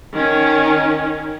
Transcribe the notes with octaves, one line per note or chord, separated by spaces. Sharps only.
D#3 C#4